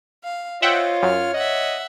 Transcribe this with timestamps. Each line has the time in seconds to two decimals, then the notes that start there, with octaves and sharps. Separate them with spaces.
0.24 F5
0.62 F4 C5 C#5 D#5 E5 F#5 G5
1.03 F#2 F6
1.34 D#5 E5 F#5